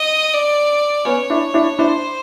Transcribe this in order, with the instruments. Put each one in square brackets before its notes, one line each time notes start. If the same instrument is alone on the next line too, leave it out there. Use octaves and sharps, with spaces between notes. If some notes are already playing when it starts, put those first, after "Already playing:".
Already playing: [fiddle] D#5
D5
[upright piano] B3 C#4 [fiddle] C#5
[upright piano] D4 E4
D4 E4
[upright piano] D4 E4 [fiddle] C5